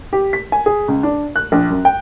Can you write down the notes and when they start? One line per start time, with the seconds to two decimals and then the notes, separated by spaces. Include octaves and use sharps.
0.13 G4
0.33 B6
0.52 G#5
0.66 G#4
0.88 C#2
1.03 D4
1.36 F#6
1.52 A#1
1.70 F#2
1.85 G5